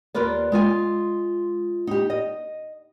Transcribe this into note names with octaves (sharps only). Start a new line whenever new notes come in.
D#2 F4 A#4 B4 D5
G#3 F4 G#5
D#4 G4
D#5